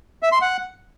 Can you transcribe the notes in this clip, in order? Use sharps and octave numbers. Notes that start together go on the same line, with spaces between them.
E5
C6
F#5